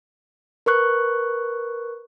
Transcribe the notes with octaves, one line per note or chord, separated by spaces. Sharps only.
A#4 B4 C#6 F#6